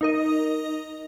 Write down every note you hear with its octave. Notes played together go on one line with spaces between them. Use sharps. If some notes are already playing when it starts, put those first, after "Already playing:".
D#4 A#4 D#5